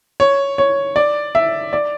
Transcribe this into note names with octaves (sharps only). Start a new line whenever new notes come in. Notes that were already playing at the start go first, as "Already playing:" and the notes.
C#5
C#5
D5
E5
D5